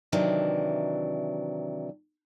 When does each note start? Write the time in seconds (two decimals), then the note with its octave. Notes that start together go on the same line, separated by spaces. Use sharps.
0.12 C3 D#3 E3 F#3 D4